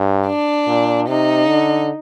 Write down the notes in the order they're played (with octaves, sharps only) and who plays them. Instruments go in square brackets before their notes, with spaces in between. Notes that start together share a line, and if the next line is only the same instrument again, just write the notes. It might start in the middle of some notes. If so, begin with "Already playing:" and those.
Already playing: [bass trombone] G2
[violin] D4
[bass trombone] A#2
[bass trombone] C3 [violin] D#4
[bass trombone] D3